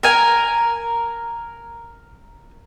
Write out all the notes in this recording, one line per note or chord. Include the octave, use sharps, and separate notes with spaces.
A#4 G#5